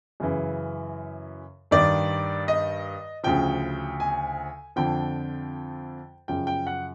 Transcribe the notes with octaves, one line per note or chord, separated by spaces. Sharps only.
F#2 C#3 E3
G2 D#3 D5
D#5
D2 C#3 F3 G5
G#5
F2 D3 F3 G5
F#2 C#3 F3 G5
G5
F#5